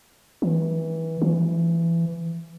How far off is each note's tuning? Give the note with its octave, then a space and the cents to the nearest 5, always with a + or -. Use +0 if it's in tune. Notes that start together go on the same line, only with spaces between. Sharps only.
E3 -25
E3 +25